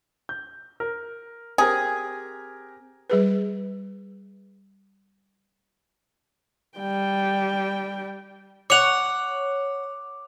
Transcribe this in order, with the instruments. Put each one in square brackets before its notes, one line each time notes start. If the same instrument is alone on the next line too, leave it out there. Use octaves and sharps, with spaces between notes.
[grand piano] G6
A#4
[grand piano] C4 G4 A#4 [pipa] G#4
[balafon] G3 G#4 B4
[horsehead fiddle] G3 G5
[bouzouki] C#5 F#5 [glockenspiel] D6 F7